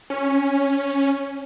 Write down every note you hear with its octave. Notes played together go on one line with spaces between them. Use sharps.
C#4